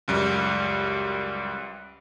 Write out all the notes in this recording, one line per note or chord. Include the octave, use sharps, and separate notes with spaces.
C#2 F#2 G3